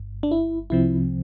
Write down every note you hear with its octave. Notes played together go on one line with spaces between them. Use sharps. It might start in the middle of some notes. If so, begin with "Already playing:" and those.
Already playing: G1 G2
D4
E4
C2 C3 F3 C4 E4